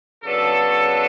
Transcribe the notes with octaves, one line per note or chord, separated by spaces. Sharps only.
C#3 F#3 B3 D4 A4